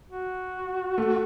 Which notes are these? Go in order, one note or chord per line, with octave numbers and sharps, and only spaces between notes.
F#4
A3